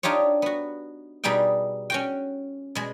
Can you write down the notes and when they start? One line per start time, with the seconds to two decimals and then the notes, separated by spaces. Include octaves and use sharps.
0.03 D4 D#4 F4 G4 C#5
0.42 B3 F#4
1.24 B2 G3 D#4 G#4 G5
1.90 C#4 F#4 G5
2.75 B2 G#3